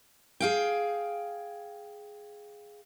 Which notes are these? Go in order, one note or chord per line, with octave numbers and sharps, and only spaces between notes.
G#4 F5 G5